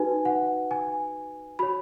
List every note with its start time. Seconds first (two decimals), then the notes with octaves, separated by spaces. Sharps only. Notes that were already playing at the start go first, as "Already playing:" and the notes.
Already playing: D#4 F#4 B4 G#5
0.25 F#5
0.71 G#5
1.59 F#4 C#5 B5